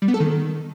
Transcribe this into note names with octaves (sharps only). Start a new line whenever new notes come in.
G3
B3
A4
D#3